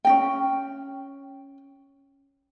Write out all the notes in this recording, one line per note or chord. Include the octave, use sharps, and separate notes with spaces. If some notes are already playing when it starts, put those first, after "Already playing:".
C#4 D#4 G5